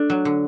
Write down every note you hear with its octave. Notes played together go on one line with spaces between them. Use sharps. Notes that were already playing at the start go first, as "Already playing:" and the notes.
Already playing: A3 D4
F#3
D3